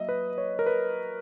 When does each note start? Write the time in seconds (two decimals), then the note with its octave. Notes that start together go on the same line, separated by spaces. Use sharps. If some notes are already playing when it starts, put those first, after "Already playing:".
Already playing: F#3 A#3 D#5 E5
0.09 B4
0.38 C#5
0.59 A#4
0.66 B4